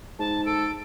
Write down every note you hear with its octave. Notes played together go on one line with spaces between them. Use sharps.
G#2 A5
A4 D7